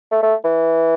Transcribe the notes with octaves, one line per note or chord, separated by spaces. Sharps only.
A3
A3
E3